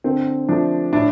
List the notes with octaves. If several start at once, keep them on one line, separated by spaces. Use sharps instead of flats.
D3 C4
F3 A3 D4
A2 D4